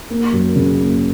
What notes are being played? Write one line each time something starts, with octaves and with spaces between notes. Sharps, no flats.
A#3
F#2
C#3
A#3